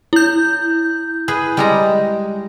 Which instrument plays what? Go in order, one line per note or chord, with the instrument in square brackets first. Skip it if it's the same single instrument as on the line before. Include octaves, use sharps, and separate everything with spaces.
[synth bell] E4 G6
[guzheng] G#4 B4
G3 G#3 A#5